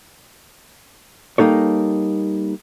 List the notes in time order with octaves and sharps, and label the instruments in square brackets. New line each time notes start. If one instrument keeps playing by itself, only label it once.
[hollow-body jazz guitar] G3 A#3 D#4 A4 C#5